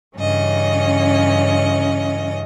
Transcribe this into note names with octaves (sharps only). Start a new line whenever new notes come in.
G2 C#3 E3 C#4 D#5